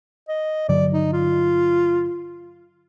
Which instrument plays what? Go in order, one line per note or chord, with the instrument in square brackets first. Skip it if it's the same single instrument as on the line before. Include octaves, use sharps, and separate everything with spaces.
[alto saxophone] D#5
[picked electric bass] G2 D3 F#3 [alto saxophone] D5
[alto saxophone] D#4
F4